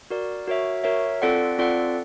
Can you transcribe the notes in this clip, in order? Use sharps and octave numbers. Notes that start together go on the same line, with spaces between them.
F#4 A#4 D5
F#4 A#4 C#5 E5
F#4 A#4 C#5 E5
C4 F4 A4 D5 F#5
C4 F4 A4 D5 F#5